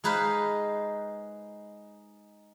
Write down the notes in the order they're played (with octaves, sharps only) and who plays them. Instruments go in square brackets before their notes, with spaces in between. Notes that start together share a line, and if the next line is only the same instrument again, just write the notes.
[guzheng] G#3 D#4 B4 C5 F5